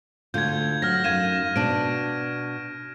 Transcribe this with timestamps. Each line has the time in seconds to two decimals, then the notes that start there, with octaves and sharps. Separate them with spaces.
0.34 D2 D3 F4 G6 G#6
0.82 F#3 F6 A#6
1.04 F#2 D#4 F5 G#6 D#7 E7
1.56 B2 D4 D7